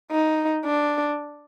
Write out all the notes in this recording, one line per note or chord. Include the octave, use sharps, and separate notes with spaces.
D#4
D4